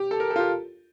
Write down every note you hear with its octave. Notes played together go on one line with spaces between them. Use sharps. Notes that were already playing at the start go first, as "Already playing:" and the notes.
Already playing: G4
A4
A#4
A4
F4
G4